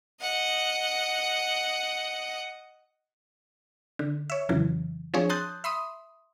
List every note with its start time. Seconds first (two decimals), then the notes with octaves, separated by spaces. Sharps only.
0.22 D#5 F#5
3.99 D3
4.30 C#5 E5
4.49 F2 C#3 E3 F#3
5.14 F3 C4 D4 G#4 C#5
5.29 A5 C6 D#6 F#6 G6 A6
5.64 E5 B5 C6 D#6